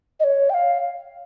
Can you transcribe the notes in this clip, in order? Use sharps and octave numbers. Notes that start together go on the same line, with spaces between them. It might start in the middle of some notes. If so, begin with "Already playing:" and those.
D#5
C#5
G5
F5